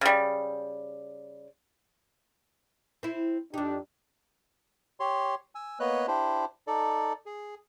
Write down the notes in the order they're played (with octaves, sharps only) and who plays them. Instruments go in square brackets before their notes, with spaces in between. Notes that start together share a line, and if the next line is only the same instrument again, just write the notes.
[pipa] C#3 G3
[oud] C4 E4
[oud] F2 D#4 [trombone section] D4 G4
[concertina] G4 C#5 C6
G#5 E6
A#3 B3 B4 C#5 D#5 F#6
D4 E4 G4 C5
D#4 A4 D5
G#4